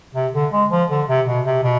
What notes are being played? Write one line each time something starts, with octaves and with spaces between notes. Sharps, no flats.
C3
D3
G#3
F3
D3
C3
B2
C3
B2